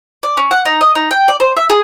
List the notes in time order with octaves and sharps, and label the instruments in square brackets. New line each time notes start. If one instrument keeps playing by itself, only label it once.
[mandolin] D5
C#4
F#5
D#4
D#5
D#4
G5
D5
C5
E5
G#4